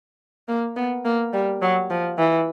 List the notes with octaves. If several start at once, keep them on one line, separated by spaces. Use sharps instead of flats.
A#3
B3
A#3
G3
F#3
F3
E3